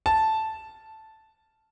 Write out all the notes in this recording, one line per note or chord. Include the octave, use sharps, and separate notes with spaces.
A5